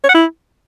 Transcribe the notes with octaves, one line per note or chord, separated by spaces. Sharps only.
C#5
F#5
E4